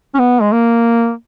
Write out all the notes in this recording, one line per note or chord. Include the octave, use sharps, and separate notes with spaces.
C#4
B3
G#3
A#3